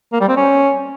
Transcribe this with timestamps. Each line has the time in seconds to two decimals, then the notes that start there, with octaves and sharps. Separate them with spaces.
0.13 A#3
0.21 G3
0.29 C4
0.37 C#4